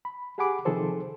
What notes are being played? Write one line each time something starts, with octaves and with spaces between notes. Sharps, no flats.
B5
G4 G#4 F#5 G#5 B5 D6
C3 D#3 F3 G#4 A4 C5